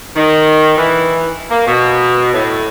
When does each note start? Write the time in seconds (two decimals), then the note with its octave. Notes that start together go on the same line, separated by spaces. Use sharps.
0.16 D#3
0.77 E3
1.49 A#3
1.67 B2
2.33 A2